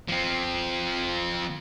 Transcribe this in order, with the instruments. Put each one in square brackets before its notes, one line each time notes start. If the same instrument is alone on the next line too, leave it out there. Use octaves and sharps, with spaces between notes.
[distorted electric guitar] F3 C4